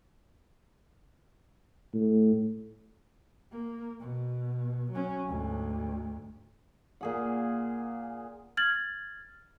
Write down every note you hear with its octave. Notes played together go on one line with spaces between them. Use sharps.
A2
A#3
B2
F#3 C#4
D2 G#2
A#2 G#4 F#5
F6 G#6 A6 F#7